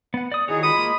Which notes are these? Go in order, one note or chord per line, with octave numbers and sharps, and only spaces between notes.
B3 F#5
D5 D#6
D#3 D#4 E4 F#4 G#4 C#5
G#3 F4 B5 D#6
A#3